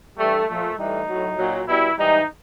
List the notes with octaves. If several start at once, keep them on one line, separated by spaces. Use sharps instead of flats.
G2 E3 G3 A3
A#2 F3 A3
A2 E3 G3 D#4
A2 F#3
A#2 F#3
B2 G3 E4
G#2 E3 G3 D#4